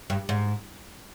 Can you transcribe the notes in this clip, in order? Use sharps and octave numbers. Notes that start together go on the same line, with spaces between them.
G2
G#2